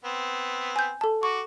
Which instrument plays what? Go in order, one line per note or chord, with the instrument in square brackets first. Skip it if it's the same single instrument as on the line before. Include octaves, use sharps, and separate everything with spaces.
[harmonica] B3 C4
[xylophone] G#5 G6
A4 A5
[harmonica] F#4 D6 [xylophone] C#6